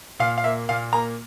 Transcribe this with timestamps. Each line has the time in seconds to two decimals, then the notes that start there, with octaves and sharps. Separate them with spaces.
0.19 A#2 F5
0.38 F5
0.44 A#3 E5
0.69 A#2 F5
0.93 A#3 A#5